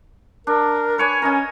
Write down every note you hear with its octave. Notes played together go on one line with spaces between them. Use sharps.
D4 A#4
B4 C#5 G#5
C#4 A#4 D#5 G#5